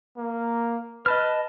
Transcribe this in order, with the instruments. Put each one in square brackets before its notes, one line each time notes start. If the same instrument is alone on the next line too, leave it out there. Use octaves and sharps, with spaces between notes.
[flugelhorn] A#3
[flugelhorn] B4 [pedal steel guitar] D#5 A5 F6